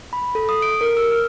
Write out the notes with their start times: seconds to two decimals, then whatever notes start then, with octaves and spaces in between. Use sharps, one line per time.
0.13 B5
0.35 A4
0.49 D#6
0.62 D7
0.81 A#4
0.97 E6
1.11 F6